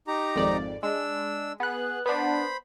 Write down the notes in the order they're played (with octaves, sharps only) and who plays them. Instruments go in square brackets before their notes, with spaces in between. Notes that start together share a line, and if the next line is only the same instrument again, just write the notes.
[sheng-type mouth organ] D#4 G4 A#5
[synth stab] G#1 F2 D5
[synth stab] G#3 [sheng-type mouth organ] D4 E6
[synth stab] B3 F#6 [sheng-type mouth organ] G#4
[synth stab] B3 D4 [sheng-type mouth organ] C5 B5